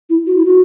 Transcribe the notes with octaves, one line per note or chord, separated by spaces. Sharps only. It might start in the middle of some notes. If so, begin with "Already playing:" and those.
E4
F#4
E4
F#4